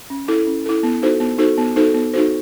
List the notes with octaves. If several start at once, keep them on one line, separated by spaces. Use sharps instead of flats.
C#4
E4 A4
C#4
E4 A4
B3
D#4 F#4 A4 C5
B3
D#4 F#4 A4 C5
B3
D#4 F#4 A4 C5
B3
D#4 F#4 A4 C5